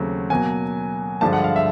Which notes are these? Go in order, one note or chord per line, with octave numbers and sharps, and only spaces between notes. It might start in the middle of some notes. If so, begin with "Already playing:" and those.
Already playing: D#2 C#3 F#3 A3 C4
B2 F#3 A#3 G#5
G2 D3 F3 G#3 A5
F#5
F5
E5